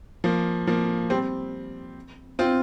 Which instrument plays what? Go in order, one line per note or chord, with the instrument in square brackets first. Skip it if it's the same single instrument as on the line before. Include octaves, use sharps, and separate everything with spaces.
[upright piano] F3 A#3
F3 A#3
G3 C4
C4 F4